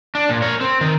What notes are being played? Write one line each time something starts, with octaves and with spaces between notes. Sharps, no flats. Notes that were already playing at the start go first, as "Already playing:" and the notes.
D4
A#2
A#4 C#5
C4
D#3